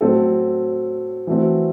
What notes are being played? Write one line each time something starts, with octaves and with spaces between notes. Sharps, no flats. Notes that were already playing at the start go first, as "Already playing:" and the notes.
A2 F#3 C4 F#4 A4
E3 A3 C4 F#4